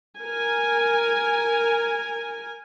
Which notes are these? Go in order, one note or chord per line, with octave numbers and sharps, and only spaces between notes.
A#4 G#5